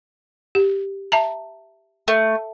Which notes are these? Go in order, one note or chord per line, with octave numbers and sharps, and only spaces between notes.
G4
E5 A5 A#5
A3